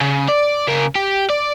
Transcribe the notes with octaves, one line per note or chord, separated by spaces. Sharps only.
C#3
D5
C#3 A#4
G4
D5